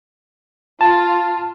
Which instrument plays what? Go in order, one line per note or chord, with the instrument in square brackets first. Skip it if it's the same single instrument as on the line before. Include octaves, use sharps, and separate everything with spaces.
[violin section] F4 [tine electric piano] A5